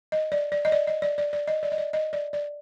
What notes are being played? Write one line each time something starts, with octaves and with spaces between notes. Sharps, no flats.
D#5
D5
D5
D#5
D5
D#5
D5
D5
D5
D#5
D5
D#5
D5
D#5
D5
D5